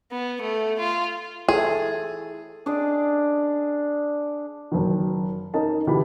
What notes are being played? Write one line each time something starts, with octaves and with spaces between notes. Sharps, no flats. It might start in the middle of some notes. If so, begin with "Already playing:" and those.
B3
A3
F4
E4 G#4 A4
D4 G#4 D5 D#5
F#1 D#3
C#4 D#4 A#4 D#5 A5
D2 E3 G4 B5